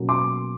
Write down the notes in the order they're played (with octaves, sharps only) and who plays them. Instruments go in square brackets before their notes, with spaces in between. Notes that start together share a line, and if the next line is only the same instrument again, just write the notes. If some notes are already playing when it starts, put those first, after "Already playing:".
Already playing: [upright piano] B2 F#3 A#3 C#4
C6 D6